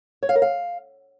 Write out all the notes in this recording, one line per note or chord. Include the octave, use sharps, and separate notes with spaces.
C#5
F5
A#4
F5